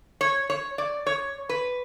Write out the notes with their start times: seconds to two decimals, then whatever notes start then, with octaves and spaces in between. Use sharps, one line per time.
0.21 C#5
0.50 C#5
0.78 D5
1.06 C#5
1.49 B4